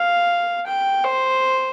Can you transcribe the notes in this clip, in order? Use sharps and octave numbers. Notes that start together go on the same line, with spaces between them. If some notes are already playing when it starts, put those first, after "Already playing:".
Already playing: F5
G5
C5